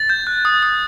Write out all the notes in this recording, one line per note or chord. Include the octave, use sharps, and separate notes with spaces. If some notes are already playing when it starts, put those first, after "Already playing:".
Already playing: A6
G6
F#6
D#6
D#6